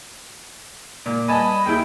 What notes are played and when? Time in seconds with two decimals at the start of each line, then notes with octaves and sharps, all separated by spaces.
1.06 A#2
1.28 G3 B4 D#5 G#5 A5 B5
1.66 D#2 E4 G#4 G5